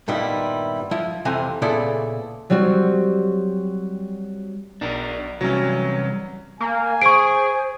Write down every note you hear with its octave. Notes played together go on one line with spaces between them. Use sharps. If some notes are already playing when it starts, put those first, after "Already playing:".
G2 A#2 D#3 G3 B3 E4
F3 E4
F2 C3 E3 G#5 A#5
A#2 C#3 B3 E4 A4 D5
F#3 G3 C4 F#4
B1 D4 A#4
C3 E3 F#3 G3 C#4
A#3 G#5
G#4 C5 C#6 D7